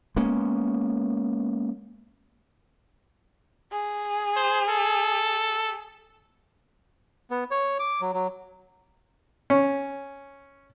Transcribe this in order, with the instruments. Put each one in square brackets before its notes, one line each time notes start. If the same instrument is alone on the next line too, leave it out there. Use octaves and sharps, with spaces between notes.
[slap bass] G#3 A#3 B3 C#4
[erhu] G#4
[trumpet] C5
A4
[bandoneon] B3
C#5
D6
F#3
F#3
[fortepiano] C#4